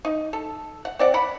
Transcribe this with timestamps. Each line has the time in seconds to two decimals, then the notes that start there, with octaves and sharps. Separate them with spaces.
0.05 D#4
0.33 A4
0.85 F#5
0.99 C4 D5 F#5
1.14 F#5 B5